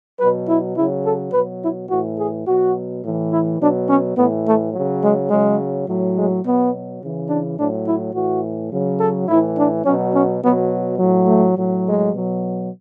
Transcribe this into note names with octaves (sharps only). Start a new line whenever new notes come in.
B2 F#3 B4
E4
C#3 F#3 E4
A4
B2 F#3 B4
E4
A2 E3 F#4
G#4
B2 F#3 F#4
A2 E3
E4
B2 F#3 D4
C#4
A2 E3 B3
A3
C#3 F#3
G#3
C#3 F#3 G#3
A2 F#3
G#3
B2 F#3 B3
C#3 E3
D4
A2 F#3 D4
E4
A2 E3 F#4
C#3 F#3
A4
A2 E3 E4
D4
B2 F#3 C#4
C#4
B2 F#3 B3
A2 F#3
A3
A2 F#3
G#3
B2 F#3